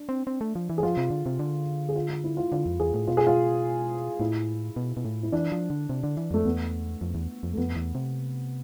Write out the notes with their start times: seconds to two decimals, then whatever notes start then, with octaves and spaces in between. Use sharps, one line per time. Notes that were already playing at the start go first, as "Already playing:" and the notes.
Already playing: D4
0.09 C4
0.27 C4
0.41 A3
0.55 F3
0.70 E3
0.78 G#4
0.83 F3 F4
0.97 C3
1.11 D3
1.26 C3
1.39 D3
1.89 G#4
1.96 F4
2.10 F4
2.24 E4
2.37 F4
2.52 D3 F4
2.66 F2
2.80 E2 G#4
2.94 A2
3.07 B2 F4
3.17 G#4
3.27 F4
4.20 A2 E4
4.76 B2
4.97 B2
5.05 A2
5.23 E4
5.32 E3 D4
5.52 F3
5.70 D3
5.89 C3
6.03 D3
6.17 E3
6.31 F2 A3
6.45 E2 B3
7.01 F2
7.15 E2
7.43 F2
7.53 A3
7.57 F2 B3
7.76 E2
7.95 C3